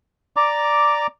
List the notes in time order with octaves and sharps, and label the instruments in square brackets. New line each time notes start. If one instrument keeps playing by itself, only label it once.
[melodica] D5 A#5 D6